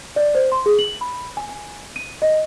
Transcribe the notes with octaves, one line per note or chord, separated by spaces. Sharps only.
D5
C5
C6
G#4
F#7
B5
G#5
G#5
D#7
D#5